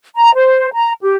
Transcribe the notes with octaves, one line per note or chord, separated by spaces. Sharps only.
A#5
C5
A#5
G4